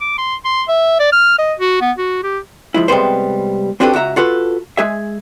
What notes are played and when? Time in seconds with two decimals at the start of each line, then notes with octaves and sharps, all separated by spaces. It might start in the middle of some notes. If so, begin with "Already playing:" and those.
0.01 D6
0.18 C6
0.45 C6
0.68 E5
0.99 D5
1.12 F6
1.39 D#5
1.60 F#4
1.81 B3
1.98 F#4
2.23 G4
2.74 F3 G#3 E4
2.88 C3 G3 G#3 B3 B4 C5
3.80 C4 D4 F#4 G4 A4 B4
3.93 C#2 F#4 E5 A#5
4.16 F4 F#4 A4 B4
4.77 G#3 G#4 E5